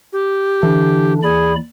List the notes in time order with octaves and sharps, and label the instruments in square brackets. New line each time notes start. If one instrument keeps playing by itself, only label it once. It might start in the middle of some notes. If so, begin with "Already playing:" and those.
[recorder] G4
[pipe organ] D3 D4 [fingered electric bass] E3
[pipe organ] D#2 D5 B5 [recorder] G#4